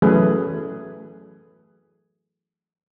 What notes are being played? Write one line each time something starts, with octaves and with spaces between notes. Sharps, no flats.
E3 F#3 A3 C#4 G#4 B4